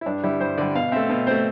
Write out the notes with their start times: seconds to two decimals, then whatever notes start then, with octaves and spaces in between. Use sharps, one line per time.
0.01 E4
0.06 G2 D4
0.23 D3 G3 E4
0.40 G2 C5
0.58 D3 G3 D5
0.75 B2 F5
0.92 A3 C4 E5
1.10 B2
1.27 A3 C4 C5